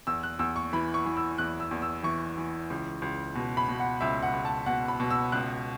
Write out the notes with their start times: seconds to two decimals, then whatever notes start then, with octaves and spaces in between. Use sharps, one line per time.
0.07 E2 E6
0.23 F#6
0.39 E2 E6
0.56 C#6
0.73 E3 B5
0.94 C#6
1.06 E3
1.17 E6
1.38 E2 F#6
1.60 E6
1.71 E2
1.82 E6
2.03 E3 C#6
2.37 E3
2.70 C#2
3.02 C#2
3.35 B2
3.57 B5
3.68 B2
3.80 F#5
4.01 C#2 E5
4.22 F#5
4.34 C#2
4.45 A5
4.66 B2 F#5
4.88 B5
5.00 B2
5.10 E6
5.32 C#2 F#6